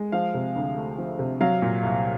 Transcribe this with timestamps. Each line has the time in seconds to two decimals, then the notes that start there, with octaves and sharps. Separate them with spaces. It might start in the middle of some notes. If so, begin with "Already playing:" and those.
Already playing: G#3
0.12 F3 F5
0.34 C3
0.55 D2
0.77 A3
0.98 F3
1.19 C3
1.41 F#3 F5
1.62 A#2
1.83 C2